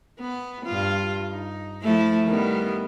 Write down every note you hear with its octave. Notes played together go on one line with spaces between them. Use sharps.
B3
G2 F4
D#4
F3 A3 E4
D#3 G3 B3